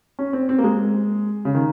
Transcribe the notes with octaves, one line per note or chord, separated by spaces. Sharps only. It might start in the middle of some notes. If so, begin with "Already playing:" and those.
C#4
C4
C4
A#3
G#3
C#3
D#3